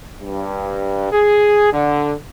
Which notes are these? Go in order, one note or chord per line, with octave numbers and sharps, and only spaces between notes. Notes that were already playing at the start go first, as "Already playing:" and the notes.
G2
G#4
D3